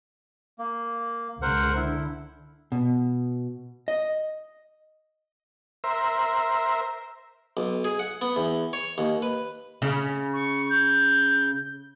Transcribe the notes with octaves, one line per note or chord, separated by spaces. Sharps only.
A#3
C#2 A#4 C5 F#5
D3 E4
B2
D#5
A#4 C5 E5
B1
G#4
F#5
B3
E2
C#5
D#2
B4
C#3
C#6
G6